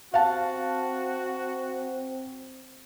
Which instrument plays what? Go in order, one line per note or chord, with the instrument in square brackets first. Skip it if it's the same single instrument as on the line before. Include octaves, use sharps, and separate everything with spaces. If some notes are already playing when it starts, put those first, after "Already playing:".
[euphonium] C4 [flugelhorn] F#4 [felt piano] F5 F#5 A5